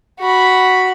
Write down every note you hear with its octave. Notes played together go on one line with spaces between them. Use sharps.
F#4 B5